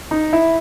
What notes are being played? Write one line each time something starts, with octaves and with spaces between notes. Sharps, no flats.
D#4
E4